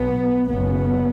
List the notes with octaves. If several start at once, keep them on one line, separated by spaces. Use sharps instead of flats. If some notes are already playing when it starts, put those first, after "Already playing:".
Already playing: B1 B2 B3
F#1 F#2 C#3 B3